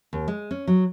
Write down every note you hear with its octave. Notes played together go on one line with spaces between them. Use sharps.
D#2
G#3
C#4
F#3